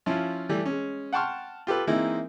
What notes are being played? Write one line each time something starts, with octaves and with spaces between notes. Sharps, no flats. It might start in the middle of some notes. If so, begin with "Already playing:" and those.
F3 C#4 E4 F4
E3 G3 A3
G#3 C#4
F#5 G5 A5 C6 C#6 F6
F4 G4 A4 B4
E3 G#3 A#3 C4 D#4 E4